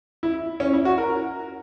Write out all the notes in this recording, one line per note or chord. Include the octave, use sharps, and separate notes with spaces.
E4
C#4
E4
F#4
A#4